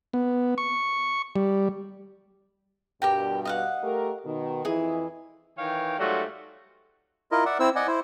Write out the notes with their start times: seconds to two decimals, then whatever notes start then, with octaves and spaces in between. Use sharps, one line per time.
0.13 B3
0.58 C#6
1.36 G3
3.02 G2 B2 G4 A#4 G5
3.45 D#5 F5 F#5
3.82 A3 G4 A#4
4.25 B2 D#3
4.65 F2 E3 E4 G#4 D#5
5.58 D#3 E3 C#5 F5 G5
5.99 G#2 F#3 G3 A3 F4 F#4
7.32 E4 F4 A#4 D#5
7.46 D5 E5 F#5
7.60 C4 E4 C5 E6
7.76 D5 D#5 F#5 G#5
7.87 E4 C5